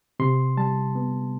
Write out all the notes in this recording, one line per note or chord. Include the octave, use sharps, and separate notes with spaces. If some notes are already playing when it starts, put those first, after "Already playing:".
C3 C6
G3 A5
B3